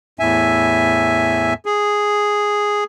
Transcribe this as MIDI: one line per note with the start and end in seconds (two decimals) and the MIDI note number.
0.19 1.54 40
0.19 1.54 45
0.19 1.54 76
0.19 1.54 80
1.65 2.84 68